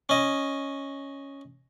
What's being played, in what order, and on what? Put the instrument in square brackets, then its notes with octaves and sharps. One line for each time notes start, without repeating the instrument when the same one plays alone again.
[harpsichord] C#4 D#5